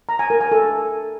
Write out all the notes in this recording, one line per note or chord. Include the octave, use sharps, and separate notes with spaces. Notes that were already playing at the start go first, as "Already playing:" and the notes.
A#5
G#5
A#4
G#5
A4